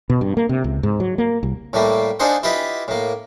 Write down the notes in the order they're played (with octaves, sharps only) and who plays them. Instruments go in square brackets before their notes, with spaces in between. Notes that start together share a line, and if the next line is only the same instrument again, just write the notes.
[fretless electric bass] B2
G2
A#3
C3
C#2
G#2
F#3
A#3
C2
[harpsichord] A2 G3 A3 A#3
D4 D#4 F4 G#4 C5 F#5
E4 F4 G4 B4 D#5 B5
A2 A#3